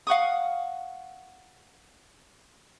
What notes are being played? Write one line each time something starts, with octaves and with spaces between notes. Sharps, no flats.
F5 F#5 C#6 D#6